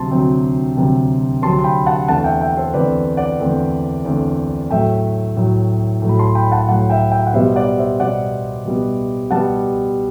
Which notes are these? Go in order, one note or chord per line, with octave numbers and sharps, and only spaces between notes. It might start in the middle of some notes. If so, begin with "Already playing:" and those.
Already playing: D2 C3 F#3 C4 A5 C6
D2 C3 F#3 C4
D2 C3 F#3 C4
D2 C3 F#3 C4 A5 C6
C6
G5 B5
F#5 A5
E2 D3 A3 C4 F#5 A5
E5 G5
E5 G5
A4 C5
E2 D3 A3 C4 B4 D5
D5 F#5
E2 D3 A3 C4
E2 D3 A3 C4
A2 F#3 A3 E5 G5
A2 F#3 A3
A2 F#3 A3
B5
A5 C6
G5 B5
F#5 A5
A2 F#3 A3 F#5 A5
E5 G5
E5 G5
F#5
B2 G3 B3 C5 E5
D5 F#5
C5 E5
B2 G3 B3 D5 F#5
B2 G3 B3
B2 G3 B3 F#5 A5